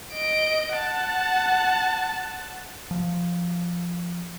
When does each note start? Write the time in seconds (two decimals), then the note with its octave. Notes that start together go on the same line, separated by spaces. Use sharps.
0.14 D#5 D7
0.74 F#5 A5
2.91 F3